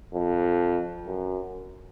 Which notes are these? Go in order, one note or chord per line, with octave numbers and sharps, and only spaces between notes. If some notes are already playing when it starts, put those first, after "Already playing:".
F2
F#2